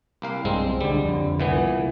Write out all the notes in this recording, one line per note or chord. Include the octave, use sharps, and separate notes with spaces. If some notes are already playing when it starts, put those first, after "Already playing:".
C2 A#3 F5
B1 G2 G#3 C4
C#2 D3 G3
F2 D3
C2 A#2 E3 B3